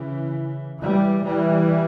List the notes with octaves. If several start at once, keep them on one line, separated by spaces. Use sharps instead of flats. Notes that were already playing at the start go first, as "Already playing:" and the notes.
Already playing: C#3 E3
E3 G3
E3 G3